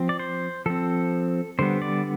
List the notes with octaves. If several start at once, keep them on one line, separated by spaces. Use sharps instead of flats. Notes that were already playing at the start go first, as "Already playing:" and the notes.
Already playing: F3 C4
D5
C5
F3 C4 A4
D3 G3 B3 C5
D5